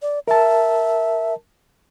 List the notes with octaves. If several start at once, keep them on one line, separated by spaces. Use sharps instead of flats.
D5
A#4 E5 A5